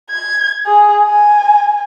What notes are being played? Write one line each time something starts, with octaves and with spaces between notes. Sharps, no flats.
G#6
G#4
G#5